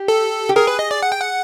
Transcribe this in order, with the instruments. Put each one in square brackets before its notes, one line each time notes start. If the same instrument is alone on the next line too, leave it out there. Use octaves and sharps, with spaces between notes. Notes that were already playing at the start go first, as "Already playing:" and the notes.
Already playing: [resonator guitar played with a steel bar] G4
[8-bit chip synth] A4
[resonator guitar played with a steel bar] G4
[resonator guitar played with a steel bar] G#4 [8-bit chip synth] A#4
[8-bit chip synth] B4
D#5
D5
F#5
G5
F#5